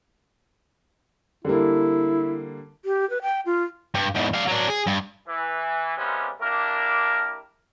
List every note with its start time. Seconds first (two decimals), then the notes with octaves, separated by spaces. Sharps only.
1.45 D3 G3 A#3 E4
2.84 G4
3.10 B4
3.22 G5
3.46 F4
3.94 G2
4.15 E2 G#2
4.34 D4 F5
4.47 F#3 D4
4.69 G#4
4.86 G2
5.27 E3
5.98 C3 G3 G#3 A#3 B3 C#4
6.41 A#3 D4 E4 G4 A#4